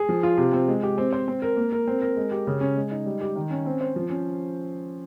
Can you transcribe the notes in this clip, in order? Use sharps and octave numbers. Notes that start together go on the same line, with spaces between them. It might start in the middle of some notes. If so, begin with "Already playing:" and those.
Already playing: G#4
F3
F4
C3
C4
G#3
G4
C4
C5
C4
A#4
A#3
A#4
C4
A#4
G#3
G4
C#3
C#4
G#3
D#4
G3
G4
D#3
C#4
C4
C5
F3
C#4